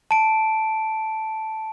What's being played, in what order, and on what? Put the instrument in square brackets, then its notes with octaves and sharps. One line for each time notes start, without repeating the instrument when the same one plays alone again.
[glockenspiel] A5 D7